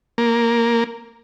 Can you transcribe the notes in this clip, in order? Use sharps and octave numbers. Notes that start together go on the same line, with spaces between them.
A#3